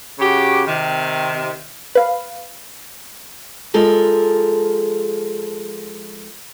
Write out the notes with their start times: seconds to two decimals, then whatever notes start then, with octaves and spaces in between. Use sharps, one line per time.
0.19 C#3 F#4 G4
0.66 C3 D#3
1.95 B4 F5
3.74 F3 G#3 A4 A#4